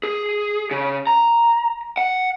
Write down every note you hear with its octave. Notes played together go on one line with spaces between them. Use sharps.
G#4
C#3
A#5
F#5